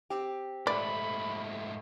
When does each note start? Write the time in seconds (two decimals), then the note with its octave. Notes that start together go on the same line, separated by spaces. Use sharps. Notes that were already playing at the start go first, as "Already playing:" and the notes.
0.10 C4 G4
0.67 G#2 A3 D5 B5